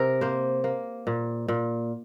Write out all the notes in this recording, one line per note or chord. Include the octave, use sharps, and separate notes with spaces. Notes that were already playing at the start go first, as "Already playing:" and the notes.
Already playing: C3 A#4
A#3 C5
A#3
A#2
A#2